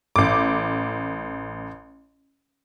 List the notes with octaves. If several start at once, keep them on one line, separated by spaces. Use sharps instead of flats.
A1 D6